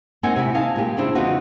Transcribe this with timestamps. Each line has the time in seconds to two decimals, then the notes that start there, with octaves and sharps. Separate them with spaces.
0.23 A#3 C4 D#4 F#5 G#5
0.36 C3 C4 E4
0.54 D#4 F5 G#5 A5
0.76 A#2 G3 G4
0.97 C#3 C4 D4 E4
1.15 E2 C#3 B3 D#4 F4 F#4